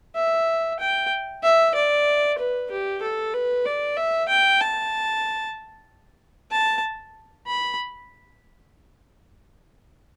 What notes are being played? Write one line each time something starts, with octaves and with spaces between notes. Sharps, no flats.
E5
G5
E5
D5
B4
G4
A4
B4
D5
E5
G5
A5
A5
B5